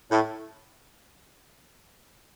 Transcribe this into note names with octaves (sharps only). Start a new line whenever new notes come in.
A2